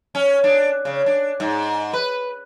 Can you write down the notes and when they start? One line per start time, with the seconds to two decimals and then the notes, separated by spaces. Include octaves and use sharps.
0.15 C#4
0.44 D4
0.85 C#3
1.06 D4
1.40 G#2
1.93 B4